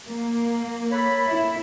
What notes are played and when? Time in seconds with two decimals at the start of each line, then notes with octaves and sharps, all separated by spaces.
0.10 A#3
0.92 A4 C#5 B5
1.27 E4